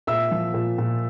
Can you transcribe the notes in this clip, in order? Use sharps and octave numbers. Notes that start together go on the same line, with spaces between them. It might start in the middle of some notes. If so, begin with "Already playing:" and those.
A#2 E5 E6
F3
A#2
A#2